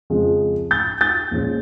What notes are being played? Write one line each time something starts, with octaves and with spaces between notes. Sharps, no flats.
F2 C#3 F3 G#3
G6 A6
G6 A6
A#1 A#2 F3 G#3 C#4